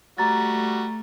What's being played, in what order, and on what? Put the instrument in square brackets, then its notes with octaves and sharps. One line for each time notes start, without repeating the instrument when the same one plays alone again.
[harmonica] G3 F#4 [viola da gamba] A3 [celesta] A#5 A6